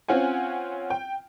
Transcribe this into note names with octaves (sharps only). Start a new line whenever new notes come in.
C4 C#4 F4 F#5 G#5
G5